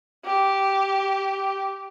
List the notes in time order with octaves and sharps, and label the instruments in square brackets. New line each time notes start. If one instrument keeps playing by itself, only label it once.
[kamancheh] G4